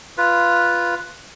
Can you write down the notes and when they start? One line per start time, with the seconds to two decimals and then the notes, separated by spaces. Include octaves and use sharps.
0.18 F4 B4